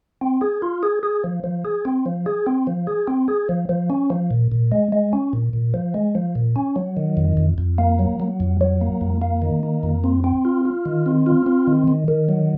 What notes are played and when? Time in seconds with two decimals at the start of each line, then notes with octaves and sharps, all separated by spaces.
0.21 C4
0.41 G#4
0.62 F4
0.83 G#4
1.03 G#4
1.24 F3
1.44 F3
1.65 G#4
1.85 C4
2.06 F3
2.26 G#4
2.47 C4
2.67 F3
2.87 G#4
3.08 C4
3.28 G#4
3.49 F3
3.69 F3
3.90 C#4
4.10 F3
4.31 A#2
4.52 A#2
4.72 G#3
4.92 G#3
5.13 C#4
5.33 A#2
5.53 A#2
5.74 F3
5.94 G#3
6.15 F3
6.35 A#2
6.56 C#4
6.76 F#3
6.97 D#3
7.17 F2
7.37 F2
7.58 F2
7.78 A#3
7.99 F#3
8.20 F#3
8.40 F2
8.61 F#3
8.81 A#3
9.01 F2
9.22 A#3
9.42 D#3
9.63 A#3
9.83 F2
10.04 C4
10.24 C4
10.45 F4
10.65 F4
10.86 D#3
11.06 C4
11.26 F4
11.46 C4
11.67 D#3
11.88 D#3
12.08 D#3
12.29 F#3